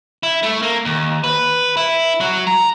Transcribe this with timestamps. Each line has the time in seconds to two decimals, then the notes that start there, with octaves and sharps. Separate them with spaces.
0.23 E4
0.43 A3
0.62 A#3
0.85 D#2
1.24 B4
1.77 E4
2.21 F#3
2.47 A#5